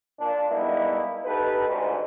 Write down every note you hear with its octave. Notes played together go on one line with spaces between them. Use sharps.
A#2 D4
G3 G#3 A#3 B3 D#4 E4
D#4 G4 A4 B4
G#1 D2 G#2